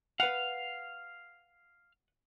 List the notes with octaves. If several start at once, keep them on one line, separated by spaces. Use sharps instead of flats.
B4 F5 F#5